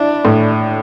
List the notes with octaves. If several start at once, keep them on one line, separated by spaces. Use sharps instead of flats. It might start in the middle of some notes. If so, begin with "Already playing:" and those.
Already playing: D4 E4
A2